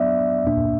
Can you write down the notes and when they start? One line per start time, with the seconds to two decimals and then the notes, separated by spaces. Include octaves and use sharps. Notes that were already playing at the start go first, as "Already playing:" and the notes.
Already playing: F#3 B3 D4 D5 E5
0.46 A#2 A#3 D4